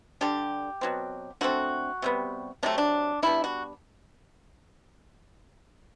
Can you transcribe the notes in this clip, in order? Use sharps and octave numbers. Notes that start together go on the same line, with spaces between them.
D3 G3 D4 G4
B2 F#3 C4
D3 A3 C4 F#4
C3 E3 G3 B3
C3 F#3 A3 C4 D4
D4
D3 G3 B3 D4 E4
F#4